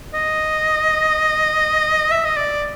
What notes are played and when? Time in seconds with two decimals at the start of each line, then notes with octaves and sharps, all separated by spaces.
0.14 D#5
2.11 E5
2.24 D#5
2.37 D5